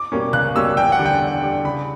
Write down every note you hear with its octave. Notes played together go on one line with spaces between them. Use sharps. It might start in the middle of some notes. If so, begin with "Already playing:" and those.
Already playing: D6
B2 G3 A#3 C#4
C#2 F#6
B2 G3 A#3 C#4 E6
E2 G5
F#5
D3 G3
G5
E2
D3 G3
C#3 B5